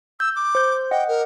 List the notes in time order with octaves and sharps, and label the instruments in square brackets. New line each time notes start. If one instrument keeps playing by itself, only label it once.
[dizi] E6 [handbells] G6
[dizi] D6
[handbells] C5 G6
[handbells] D#5 F#5 [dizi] G5
[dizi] A#4